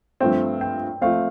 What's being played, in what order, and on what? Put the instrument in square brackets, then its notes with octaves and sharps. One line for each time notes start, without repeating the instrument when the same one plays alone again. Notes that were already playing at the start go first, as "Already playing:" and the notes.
[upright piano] G2 F3 A3 C4 [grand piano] G5
[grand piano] G5
[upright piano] F3 A3 C4 [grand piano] F5